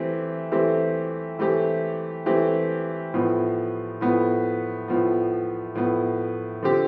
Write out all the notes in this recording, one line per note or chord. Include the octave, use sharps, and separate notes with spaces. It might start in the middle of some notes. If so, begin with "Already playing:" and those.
Already playing: E3 A3 C4 G4
E3 A3 C4 G4
E3 A3 C4 G4
E3 A3 C4 G4
A2 F3 B3
A2 F3 B3
A2 F3 B3
A2 F3 B3
D3 F3 C4 G4